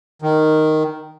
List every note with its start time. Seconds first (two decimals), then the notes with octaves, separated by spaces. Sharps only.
0.22 D#3